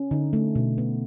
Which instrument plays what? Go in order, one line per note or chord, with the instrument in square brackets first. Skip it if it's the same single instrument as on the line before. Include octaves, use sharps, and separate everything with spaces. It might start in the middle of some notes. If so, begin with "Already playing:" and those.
Already playing: [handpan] C#4
D3 D#4
A3
B2
B3